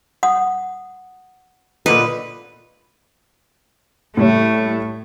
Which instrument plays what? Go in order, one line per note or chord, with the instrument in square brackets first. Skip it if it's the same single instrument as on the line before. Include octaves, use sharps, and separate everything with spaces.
[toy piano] F#5 D#6
[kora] A#2 D3 D#4 [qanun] B4
[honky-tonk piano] A2 G3 C#5 [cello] A3